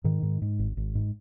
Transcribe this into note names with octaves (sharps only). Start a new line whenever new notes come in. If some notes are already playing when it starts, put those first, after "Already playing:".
G#2 D#3
G#2
G#2
G#1
G#1
G#2